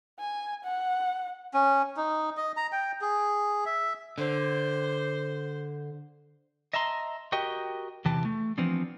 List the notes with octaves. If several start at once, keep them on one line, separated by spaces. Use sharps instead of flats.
G#5
F#5
C#4
D#4
D#5
A#5
G5
G#4
E5
D3 C5
D#5 E5 A5 A#5 C6
F#4 G4 A#4 D#5 G5
E2 C3 E3 G4 A5
A3
E3 F3 B3 C4 D4